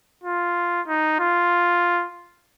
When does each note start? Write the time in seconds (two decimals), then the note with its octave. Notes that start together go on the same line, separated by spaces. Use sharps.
0.24 F4
0.88 D#4
1.19 F4